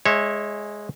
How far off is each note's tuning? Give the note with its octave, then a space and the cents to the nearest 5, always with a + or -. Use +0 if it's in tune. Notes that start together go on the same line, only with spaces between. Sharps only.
G#3 +0 C#5 -25 E5 +0